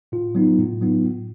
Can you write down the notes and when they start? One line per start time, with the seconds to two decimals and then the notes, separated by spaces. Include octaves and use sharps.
0.12 A2 F4
0.35 F#3 B3 D#4
0.59 A2
0.81 F#3 B3 D#4
1.03 A2